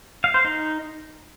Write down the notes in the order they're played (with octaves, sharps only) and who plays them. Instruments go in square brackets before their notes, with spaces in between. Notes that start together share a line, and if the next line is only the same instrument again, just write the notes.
[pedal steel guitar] F5
C5
D#4